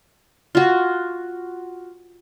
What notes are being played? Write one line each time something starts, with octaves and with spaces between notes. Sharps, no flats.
F4 F#4